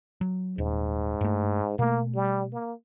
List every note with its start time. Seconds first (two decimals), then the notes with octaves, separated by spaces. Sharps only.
0.21 F#3
0.58 D#1 G#2
1.21 G2 A3
1.79 B2 A3 A#3
2.15 G3
2.53 A#3